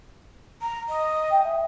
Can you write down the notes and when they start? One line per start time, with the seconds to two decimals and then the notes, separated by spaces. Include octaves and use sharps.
0.61 A#5
0.88 D#5
1.31 G5
1.43 E5